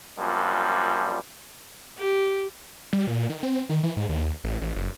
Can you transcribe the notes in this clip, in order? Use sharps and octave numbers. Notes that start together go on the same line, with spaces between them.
F#2 A#2 F3 G3 D4
G4
G3
A#2
D#3
C4
D#3
E3
G#2
D#2
A1
A1
F#1